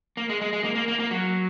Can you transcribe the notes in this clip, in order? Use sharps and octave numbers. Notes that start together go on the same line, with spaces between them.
A#3
G#3
G#3
G#3
A#3
A#3
A#3
A#3
F#3